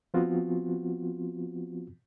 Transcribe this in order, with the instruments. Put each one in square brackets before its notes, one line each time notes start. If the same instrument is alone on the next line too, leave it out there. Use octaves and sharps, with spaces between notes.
[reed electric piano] F3 B3 C4 F4 F#4